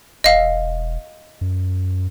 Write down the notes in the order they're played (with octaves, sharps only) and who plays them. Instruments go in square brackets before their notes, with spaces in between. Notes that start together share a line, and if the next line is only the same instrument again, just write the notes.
[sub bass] E1 [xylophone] D#5 F5
[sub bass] F#2